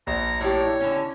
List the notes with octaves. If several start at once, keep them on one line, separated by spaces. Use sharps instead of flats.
A#1 A#5
A2 G4 C#5
E4
D3 C#4